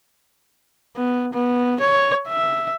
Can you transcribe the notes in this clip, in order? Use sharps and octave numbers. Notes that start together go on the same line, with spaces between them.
B3
B3
C#5
E5